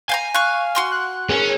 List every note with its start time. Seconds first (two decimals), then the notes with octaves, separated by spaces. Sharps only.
0.09 F5 G5 G#5 A#5
0.34 F5 C#6 F#6
0.75 F#4 C6 F6
0.91 F#6
1.30 C#4 G#4 A#4